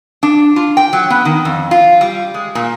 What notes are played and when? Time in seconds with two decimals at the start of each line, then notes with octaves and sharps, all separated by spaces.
0.23 D4
0.56 F4
0.77 G5
0.93 F#3
1.10 B3
1.25 D#3
1.45 F2
1.71 F4
2.01 G3
2.34 G#3
2.55 A#2